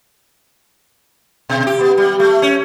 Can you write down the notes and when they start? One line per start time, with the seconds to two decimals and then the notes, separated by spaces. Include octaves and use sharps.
1.49 B2
1.67 G4
1.81 B3
1.98 G3
2.20 A3
2.42 C#4